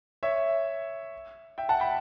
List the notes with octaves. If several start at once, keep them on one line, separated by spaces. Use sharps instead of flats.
C#5 E5
E5 G5
F#5 A5
G5 B5